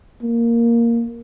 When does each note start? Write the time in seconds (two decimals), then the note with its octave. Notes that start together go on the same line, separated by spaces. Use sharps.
0.22 A#3